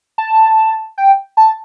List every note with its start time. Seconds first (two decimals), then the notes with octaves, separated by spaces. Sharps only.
0.18 A5
0.98 G5
1.37 A5